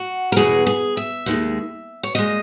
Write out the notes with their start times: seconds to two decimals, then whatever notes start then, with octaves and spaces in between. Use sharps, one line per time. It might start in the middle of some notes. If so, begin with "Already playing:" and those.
Already playing: F#4
0.32 A#4
0.36 E2 B2 F#3 G#4
0.67 G#4
0.97 E5
1.26 D#2 D#3 G#3
2.03 C#5
2.15 A#2 G#3 D#5